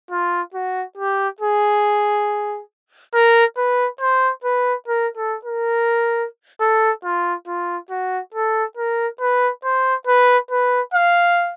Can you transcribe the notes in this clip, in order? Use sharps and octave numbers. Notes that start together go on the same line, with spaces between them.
F4
F#4
G4
G#4
A#4
B4
C5
B4
A#4
A4
A#4
A4
F4
F4
F#4
A4
A#4
B4
C5
B4
B4
F5